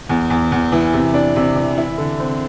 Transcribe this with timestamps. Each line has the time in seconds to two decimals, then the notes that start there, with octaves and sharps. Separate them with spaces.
0.09 E2
0.30 E2
0.52 E2
0.72 E3
0.93 C3
1.14 D4
1.36 C3
1.56 E3
1.78 E4
1.98 D3
2.19 C4